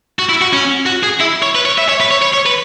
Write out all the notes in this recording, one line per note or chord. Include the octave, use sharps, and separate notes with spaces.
F#4
E4
F#4
C#4
F#4
G#4
E4
C#5
B4
C#5
E5
C#5
B4
C#5
C#5
C#5
B4